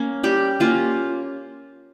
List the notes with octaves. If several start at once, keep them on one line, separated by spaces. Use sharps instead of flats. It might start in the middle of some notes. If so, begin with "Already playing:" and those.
Already playing: A#3 C#4
G3 G4
A#3 C#4 F4